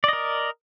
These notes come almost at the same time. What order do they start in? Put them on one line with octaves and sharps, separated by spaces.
D5 D#5 A#4